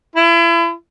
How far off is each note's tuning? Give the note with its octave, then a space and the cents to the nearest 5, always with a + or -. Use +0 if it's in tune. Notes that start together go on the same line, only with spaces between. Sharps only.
E4 +35